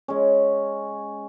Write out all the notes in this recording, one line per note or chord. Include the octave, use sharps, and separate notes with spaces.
G#3 C#4